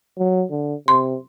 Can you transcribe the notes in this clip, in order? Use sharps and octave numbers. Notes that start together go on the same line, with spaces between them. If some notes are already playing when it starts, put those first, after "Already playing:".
F#3
D3
C3 C6